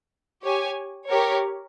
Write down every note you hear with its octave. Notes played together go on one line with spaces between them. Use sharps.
G4 C#5 G#5
G4 A#4 C#5